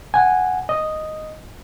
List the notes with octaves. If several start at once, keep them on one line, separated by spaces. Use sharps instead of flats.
F#5 G#5
D#5